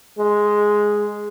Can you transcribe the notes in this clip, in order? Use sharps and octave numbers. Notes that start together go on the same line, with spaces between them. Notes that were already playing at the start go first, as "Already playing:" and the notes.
G#3